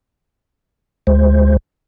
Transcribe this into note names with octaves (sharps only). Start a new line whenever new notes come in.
D2 G#3 C5